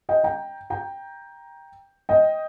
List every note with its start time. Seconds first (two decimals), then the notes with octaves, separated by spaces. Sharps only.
0.09 D#5 G5
0.24 G5 A#5
0.70 G5 A#5
2.09 D#5 G5